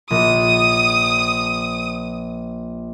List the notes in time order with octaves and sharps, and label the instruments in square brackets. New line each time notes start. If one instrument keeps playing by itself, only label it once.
[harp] A#1 [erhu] D#6